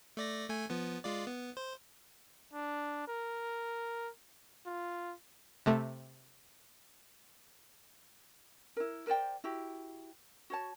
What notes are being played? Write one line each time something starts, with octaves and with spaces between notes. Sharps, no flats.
A3 D5 A#6
A3 G#5
F3 B3
G#3 F4 D5
B3
C5
D4
A#4
F4
C3 A3
E4 A#4
A#4 C5 D5 G5
E4 F#4 G4
F#4 C#5 A5